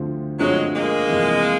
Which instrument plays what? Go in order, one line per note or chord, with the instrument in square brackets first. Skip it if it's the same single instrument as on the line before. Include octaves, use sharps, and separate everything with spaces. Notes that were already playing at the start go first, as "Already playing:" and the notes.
Already playing: [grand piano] D2 D3 F3 A3 C4
[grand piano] D2 D3 F3 A3 C4 [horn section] F#3 G#3
[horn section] G#3 A#3
[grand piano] F2 C3 E3